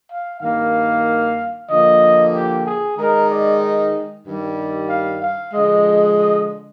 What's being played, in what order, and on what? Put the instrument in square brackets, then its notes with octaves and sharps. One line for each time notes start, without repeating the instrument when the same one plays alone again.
[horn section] F5
G2 D#3 A#3 F5
D3 F3 A#3 D#5
G4
G#4
D#3 G#3 D#4 A#4
D5
G2 D#3 G3
F5
F5
D3 F3 G#3 D#5
D#5